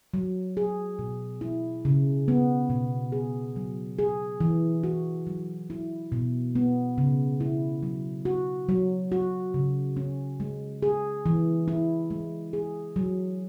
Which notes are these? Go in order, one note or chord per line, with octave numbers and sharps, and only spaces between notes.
F#3
G#4
B2
E4
C#3
B3
B2
G#4
F#3
G#4
E3
F#4
F#3
E4
B2
B3
C#3
E4
F#3
F#4
F#3
F#4
C#3
C#4
G#3
G#4
E3
E4
G#3
G#4
F#3